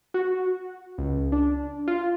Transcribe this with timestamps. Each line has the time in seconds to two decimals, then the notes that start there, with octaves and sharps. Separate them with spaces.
0.14 F#4
0.98 C#2
1.32 D4
1.88 F4